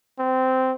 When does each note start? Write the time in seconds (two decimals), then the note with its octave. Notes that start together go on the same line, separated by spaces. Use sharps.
0.19 C4